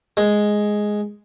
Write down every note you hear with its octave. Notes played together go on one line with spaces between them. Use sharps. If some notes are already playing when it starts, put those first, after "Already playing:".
G#3